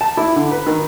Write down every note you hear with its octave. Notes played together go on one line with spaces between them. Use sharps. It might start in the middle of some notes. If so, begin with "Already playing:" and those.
A5
E4
D3
B4
D#3